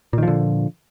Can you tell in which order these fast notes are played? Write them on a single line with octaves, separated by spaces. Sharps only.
A#2 D#3 F3 D3